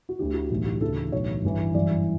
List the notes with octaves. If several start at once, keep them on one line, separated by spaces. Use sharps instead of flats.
F#4
D2 D3 G4
F#4
B1 A2 E3
G4
D2 C#3 E3 A4
B1 A2 E3 C#5
G1 G2 E3
G1 F#2 E3 D5